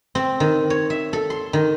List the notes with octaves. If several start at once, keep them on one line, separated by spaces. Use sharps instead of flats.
C4
D#3
C#5
E5
A4
C6
D#3